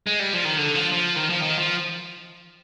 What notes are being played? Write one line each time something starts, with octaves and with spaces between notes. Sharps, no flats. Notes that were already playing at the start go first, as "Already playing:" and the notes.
G#3
G3
F3
D#3
D3
F3
F3
D#3
F3
D#3
F3